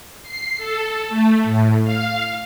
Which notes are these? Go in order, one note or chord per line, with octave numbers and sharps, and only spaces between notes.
C7
A4
A3
A2
F5